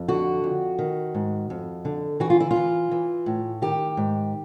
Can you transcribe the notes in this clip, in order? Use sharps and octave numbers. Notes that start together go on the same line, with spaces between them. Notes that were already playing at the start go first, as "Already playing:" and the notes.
Already playing: F2
D3 F#4
F2
D#3
G#2
F2
D3
E3 F#4
F4
E4
F4
E3
E3
A2
D#3 G4
G#2